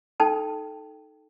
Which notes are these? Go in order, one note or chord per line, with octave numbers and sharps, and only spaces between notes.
D#4 A4 G5 A5